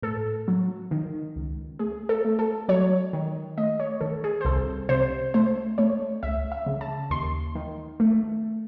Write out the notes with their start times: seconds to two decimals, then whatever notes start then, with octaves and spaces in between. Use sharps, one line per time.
0.02 A2 A4
0.48 F#3
0.91 D#3
1.36 C#2
1.79 A3 G#4
2.09 A4
2.25 A3
2.39 A4
2.69 F#3 C#5
3.13 D#3
3.57 A3 D#5
3.80 C#5
4.01 D#3 A4
4.24 G#4
4.41 C5
4.45 C2 A4
4.89 C3 C5
5.34 A3 C5
5.78 A3 C#5
6.23 C#2 E5
6.52 E5
6.66 C#3
6.81 A5
7.10 D#2 C6
7.55 D#3
8.00 A3